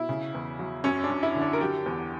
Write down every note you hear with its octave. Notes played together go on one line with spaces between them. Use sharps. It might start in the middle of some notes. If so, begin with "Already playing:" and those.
Already playing: B2 E4
C#3
E2
F#3
F#2 C#4
D4
F#2
E4
D3
D4
A#4
F#3 G4
E2